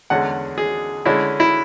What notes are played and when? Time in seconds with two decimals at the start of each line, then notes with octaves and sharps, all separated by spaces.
0.10 E2 D3 G#3 C#4 F#5
0.58 G#4
1.05 D3 G#3 C#4 E4
1.40 E4